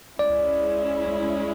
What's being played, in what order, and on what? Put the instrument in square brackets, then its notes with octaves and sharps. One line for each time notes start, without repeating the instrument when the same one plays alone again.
[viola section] G#3 C#4 E4 [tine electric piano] D5